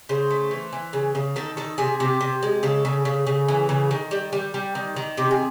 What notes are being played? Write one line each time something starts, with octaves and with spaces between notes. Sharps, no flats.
C#3 C5
A3
E3
E3
C#3
C#3
D#3 A4
D#3 A4
C3 G#4
C3 G4
C3
G#3
C#3 A4
C#3
C#3
C#3
E3
C#3
D#3
G3
G3
G3
D#3
D#3
C3 G4
G#4